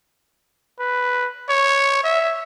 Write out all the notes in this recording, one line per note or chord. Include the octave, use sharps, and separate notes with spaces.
B4
C#5
E5